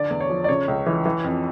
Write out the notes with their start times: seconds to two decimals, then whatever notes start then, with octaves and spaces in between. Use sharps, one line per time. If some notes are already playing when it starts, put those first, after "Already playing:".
Already playing: D3 D5
0.10 E2
0.21 C#5
0.30 F3
0.44 D5
0.49 C#3 C#5
0.68 C#2
0.86 E3
1.06 E3
1.24 F2